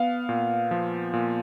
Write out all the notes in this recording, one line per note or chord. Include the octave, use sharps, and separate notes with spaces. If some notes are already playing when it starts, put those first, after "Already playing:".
Already playing: B3 F5
A#2
F3
A#2